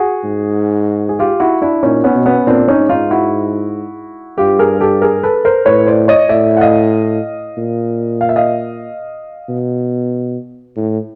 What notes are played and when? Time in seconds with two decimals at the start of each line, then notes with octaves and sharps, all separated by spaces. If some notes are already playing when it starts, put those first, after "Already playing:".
Already playing: F#4 G#4
0.24 G#2
1.09 G#4
1.19 F4 G4
1.40 E4 F#4
1.61 D4 E4
1.83 A#2 C#4 D#4
2.04 B3 C#4
2.15 B2
2.26 B3 C#4
2.47 A#2 C4 D4
2.68 C#4 D#4
2.79 G#2
2.89 D#4 F4
3.11 E4 F#4
4.38 G2 F4 G4
4.59 G#4 A#4
4.80 G4 A4
5.02 G#4 A#4
5.23 A4 B4
5.45 A#4 C5
5.66 A2 B4 C#5
5.87 C5 D5
6.08 C#5 D#5
6.29 A2 D5 E5
6.57 F#5
6.61 D#5 F5
7.57 A#2
8.21 F5
8.29 E5
8.36 D#5 F5
9.49 B2
10.76 A2